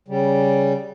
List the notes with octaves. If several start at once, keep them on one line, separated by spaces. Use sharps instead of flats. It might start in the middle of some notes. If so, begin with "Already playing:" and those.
C#3 G3